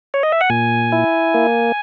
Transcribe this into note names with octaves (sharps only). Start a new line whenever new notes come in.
C#5
D#5
E5
F#5
A#2 G#5
E4
A#3